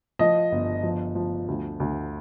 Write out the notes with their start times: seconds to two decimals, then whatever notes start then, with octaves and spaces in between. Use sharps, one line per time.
0.19 F3 D#5
0.52 G1
0.83 F3
1.15 F3
1.48 D2
1.80 D2